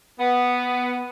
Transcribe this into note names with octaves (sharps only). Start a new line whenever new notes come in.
B3